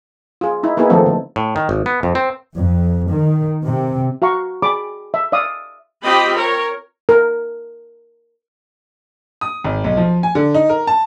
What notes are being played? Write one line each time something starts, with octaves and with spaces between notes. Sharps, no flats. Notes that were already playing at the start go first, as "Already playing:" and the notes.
F4 G#4
D#4 E4
A#3 B3 D#4 E4 G#4
D#3 F3 A3 C4 A4
D3
A2
D#3
G#1
B3
F2
C4
F2
D#3
C3
F#4 F5 A#5 C#6
G#4 D5 G5 B5 D6
E5
D5 E5 F5 D#6
C4 F4 G4 D#5 G5 B5
A#4 C#5
A#4
D#6
G#1
B1
F3
G#5
D3
D#4
A#4
A5